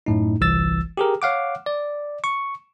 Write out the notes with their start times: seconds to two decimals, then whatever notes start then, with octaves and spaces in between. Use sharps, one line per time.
0.06 F#2 A2 D#4
0.41 G1 C2 E3 E6 A6
0.97 G4 G#4 A#4
1.22 C#5 F5 F#5 D6
1.66 D5
2.24 C#6